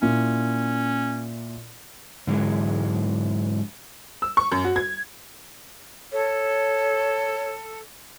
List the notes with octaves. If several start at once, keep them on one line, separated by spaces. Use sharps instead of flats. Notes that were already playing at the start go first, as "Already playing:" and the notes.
A#2 C#4 E4
G#2 D3 E3 F#3 G#3
E6
C#6
F#2
F#4
G#6
A4 C#5